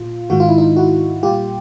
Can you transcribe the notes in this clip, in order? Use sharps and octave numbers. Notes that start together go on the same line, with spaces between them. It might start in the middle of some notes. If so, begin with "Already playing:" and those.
Already playing: A#2 F4
G#2 D#3 G#3 F#4
F4
E4
D#4 F4
E4 F#4
A#2 G3 F4 G4